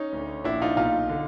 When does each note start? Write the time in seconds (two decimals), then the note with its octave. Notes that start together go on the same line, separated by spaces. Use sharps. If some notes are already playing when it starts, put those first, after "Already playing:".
Already playing: C#4 D#4
0.13 D2 D3
0.44 A#1 A#2 D4 E4
0.62 D#4 F4
0.77 B1 A#2 D#4 F4
1.09 D3